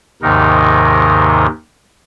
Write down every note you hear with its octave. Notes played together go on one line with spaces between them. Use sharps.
D#2 G#2 C3 D#3 D#4 A#4